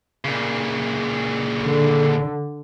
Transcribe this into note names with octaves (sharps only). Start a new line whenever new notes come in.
A#2 C#3
D3